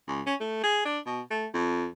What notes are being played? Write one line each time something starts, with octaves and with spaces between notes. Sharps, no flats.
C#2
C#4
A3
G#4
D4
B2
A3
F2